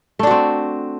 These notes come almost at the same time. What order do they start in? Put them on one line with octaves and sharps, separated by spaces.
A3 D4 F#4 C4